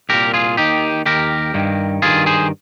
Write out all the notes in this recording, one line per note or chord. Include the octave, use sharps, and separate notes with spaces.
C2 A#2 G4 A#4
F4 G#4
D#2 D#3 D#4 G4
D#2 D#3 G4 A#4
G2 D#3
G2 D#3 F4 G#4
G#4 C5